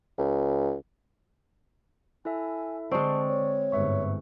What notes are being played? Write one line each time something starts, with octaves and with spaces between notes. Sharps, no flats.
C#2
E4 A4 E5 G#5
D3 G#3 C4 D5 A5 C#6
C#5
G1 G#2 B4 E5 C#6